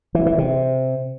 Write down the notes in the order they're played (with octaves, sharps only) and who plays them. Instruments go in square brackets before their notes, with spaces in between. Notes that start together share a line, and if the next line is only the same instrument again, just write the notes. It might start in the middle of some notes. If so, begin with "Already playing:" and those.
[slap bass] E3
E3
C3